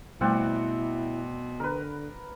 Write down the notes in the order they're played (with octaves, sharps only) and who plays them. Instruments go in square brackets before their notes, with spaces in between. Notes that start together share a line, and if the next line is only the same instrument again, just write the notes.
[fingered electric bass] B2 [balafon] G3 A3 [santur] C4 D5 F#5 [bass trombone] E4
[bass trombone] D3 [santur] A#4 B4